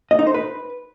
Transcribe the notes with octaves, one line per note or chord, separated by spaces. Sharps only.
D#5
D#4
C5
B4